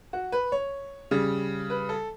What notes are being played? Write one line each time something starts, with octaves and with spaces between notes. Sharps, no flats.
F#4
B4
C#5
C#3 G3
B4
A4